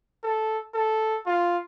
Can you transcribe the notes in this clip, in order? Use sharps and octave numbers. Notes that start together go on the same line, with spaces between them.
A4
A4
F4